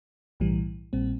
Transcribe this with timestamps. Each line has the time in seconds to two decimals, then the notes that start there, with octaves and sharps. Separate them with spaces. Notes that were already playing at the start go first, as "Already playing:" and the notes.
0.40 B1 A2 E3 G3
0.93 A#1 A#2 G3 C4